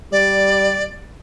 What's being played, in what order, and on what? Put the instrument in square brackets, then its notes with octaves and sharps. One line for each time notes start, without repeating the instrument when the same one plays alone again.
[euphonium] G3 [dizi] D5